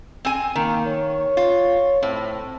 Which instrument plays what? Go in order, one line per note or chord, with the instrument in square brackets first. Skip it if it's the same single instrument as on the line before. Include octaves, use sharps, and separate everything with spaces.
[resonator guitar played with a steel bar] C4 G#5
[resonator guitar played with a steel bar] D#3 [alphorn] A#3
[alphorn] C#5
[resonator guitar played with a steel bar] F4
[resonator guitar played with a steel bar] A2 [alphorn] C4